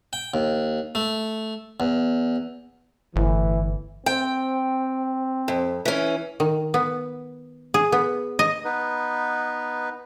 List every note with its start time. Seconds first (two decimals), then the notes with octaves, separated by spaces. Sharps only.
0.13 G5
0.34 D#2
0.95 A3
1.80 E2
3.16 G1 A2 E3
4.06 C4 G5
5.48 F2
5.85 E3 C#4
6.40 D#3
6.74 B3
7.74 G#4
7.92 B3
8.39 D#5
8.65 B3 D#4 B4